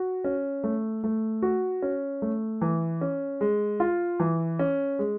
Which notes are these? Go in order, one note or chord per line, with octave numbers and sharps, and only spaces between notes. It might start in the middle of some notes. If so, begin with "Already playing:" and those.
Already playing: F#4
C#4
A3
A3
F#4
C#4
A3
E3
C#4
G#3
F4
E3
C#4
G#3